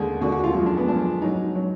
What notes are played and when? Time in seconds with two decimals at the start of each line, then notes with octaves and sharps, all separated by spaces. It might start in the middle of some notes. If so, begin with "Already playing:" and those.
Already playing: D#2 D3 G#3 G#4
0.21 D#2 D3 G#3 F#4
0.32 F#4
0.44 F4
0.54 F#2 F3 G#3
0.66 D4
0.77 B3
0.88 F#2 F3 G#3 D4
1.22 G#2 F#3 D#4
1.55 F#3